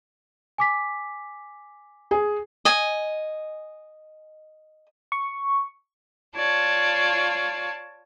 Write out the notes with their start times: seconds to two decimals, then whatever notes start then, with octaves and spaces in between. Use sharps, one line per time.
0.58 G#5 D6 B6
2.11 G#4
2.65 D#5 G#5
5.12 C#6
6.34 F4 C#5 D5 A5